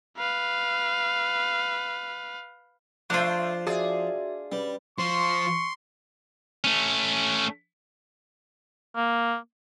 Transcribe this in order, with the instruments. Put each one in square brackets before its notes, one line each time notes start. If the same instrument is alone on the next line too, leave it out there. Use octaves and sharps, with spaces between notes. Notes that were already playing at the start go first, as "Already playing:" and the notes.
[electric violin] B4 F5
[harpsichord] F3 C5 [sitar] A3 [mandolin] D4 F4
[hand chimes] F#4 E5 [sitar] G#4 D5
[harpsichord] G3 [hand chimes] C#4 B4
[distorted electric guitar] F3 [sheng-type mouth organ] C6 [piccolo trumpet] C#6
[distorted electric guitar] A3 C#4
[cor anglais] A#3